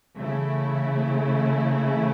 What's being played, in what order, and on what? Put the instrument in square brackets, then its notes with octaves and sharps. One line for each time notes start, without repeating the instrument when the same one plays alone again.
[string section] C#3 E3 A3 E4